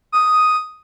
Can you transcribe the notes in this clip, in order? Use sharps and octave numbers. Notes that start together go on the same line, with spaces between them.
D#6